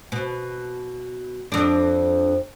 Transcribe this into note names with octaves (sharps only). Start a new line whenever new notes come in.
B2
F2 D4